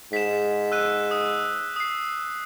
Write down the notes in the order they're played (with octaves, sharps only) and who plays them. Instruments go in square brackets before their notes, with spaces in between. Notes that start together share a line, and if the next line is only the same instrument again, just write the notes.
[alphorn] G#2 [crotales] B6 E7
[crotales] E6 F#6 D#7
D#6
D#6 C7